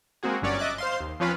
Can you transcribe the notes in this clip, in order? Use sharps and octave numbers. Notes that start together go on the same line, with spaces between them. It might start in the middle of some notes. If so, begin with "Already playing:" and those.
G#3 A#3 C4 F#4 G#4
G1 G2 F#3 C#4 C#5 D5
D#5 E5 D6 F#6 A6
C5 F5 C6
D#2
F3 C4 C#4 F4 B4 F5